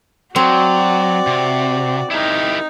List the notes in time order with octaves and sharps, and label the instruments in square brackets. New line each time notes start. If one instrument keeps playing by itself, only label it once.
[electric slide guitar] F#3 [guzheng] C4 [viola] F#4 D5
[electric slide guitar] C3
[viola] D#4 [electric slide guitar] E4 G4 A#4